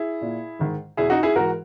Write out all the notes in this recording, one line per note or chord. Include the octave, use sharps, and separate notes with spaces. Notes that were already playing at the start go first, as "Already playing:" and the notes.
Already playing: E4 G#4
A#2
G#2 D#3
E2 B2 E4 G#4
D#4 F#4
E4 G#4
G#2 E3 F#4 A#4